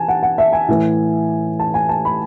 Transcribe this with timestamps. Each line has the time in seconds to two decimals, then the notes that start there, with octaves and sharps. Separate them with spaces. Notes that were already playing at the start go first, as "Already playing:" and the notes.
Already playing: E3 G#5 A5
0.08 F#5
0.23 F#5
0.38 E5
0.53 G#5
0.68 A2 E3
1.60 A5
1.74 G#5
1.89 A5
2.05 B5